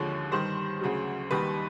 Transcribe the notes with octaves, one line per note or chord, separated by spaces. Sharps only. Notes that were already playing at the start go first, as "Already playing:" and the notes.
Already playing: D#2 D3 F3 G#3 C#5
G2 D#3 G3 C5
D2 C#3 F#3
D#2 D#3 G3 B4